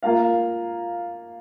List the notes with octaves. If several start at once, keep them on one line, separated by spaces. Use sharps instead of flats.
A#3 F4 A#4 F5